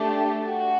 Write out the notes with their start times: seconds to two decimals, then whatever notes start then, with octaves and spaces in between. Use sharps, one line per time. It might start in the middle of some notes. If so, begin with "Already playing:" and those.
Already playing: A3 D4 G4
0.48 F#4